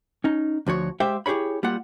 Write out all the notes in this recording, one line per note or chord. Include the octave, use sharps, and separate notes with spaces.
C#4 D#4
D2 F3 F#4 C#5
G#3 G4 C5 E5 F5 G5
E4 G4 G#4 C#5 B5
G3 A#3 F4 F#5